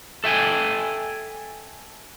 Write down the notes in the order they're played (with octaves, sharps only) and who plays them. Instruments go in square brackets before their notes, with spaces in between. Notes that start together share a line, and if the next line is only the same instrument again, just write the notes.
[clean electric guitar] A4 E5 G5 G#5